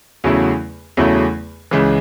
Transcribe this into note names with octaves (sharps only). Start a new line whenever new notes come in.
E2 C#3 F#3 A3 E4
E2 C#3 F#3 A3 E4
C#2 C#3 E3